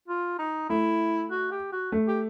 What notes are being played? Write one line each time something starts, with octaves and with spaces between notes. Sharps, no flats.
F4
D#4
A3 E4
F#4
G4
F#4
A3
G4